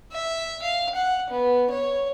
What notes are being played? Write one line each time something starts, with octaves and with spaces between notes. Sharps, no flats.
E5
F5
F#5
B3
C#5